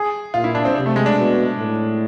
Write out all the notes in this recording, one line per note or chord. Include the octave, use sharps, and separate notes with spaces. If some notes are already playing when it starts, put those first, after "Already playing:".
Already playing: G#4
A#2 F4
E4
D4
C4
C3 C4
A3
G#3
D4
B2
A2